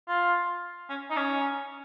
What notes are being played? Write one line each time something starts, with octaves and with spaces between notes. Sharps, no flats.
F4
C#4
D#4
C#4